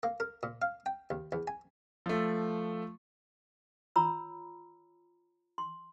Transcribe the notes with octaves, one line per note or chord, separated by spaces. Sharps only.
A#3
A#4
A#2
F5
G5
D#2
E2
G#5
F3 A3
F4 C#5 A#5 B5 E6
C6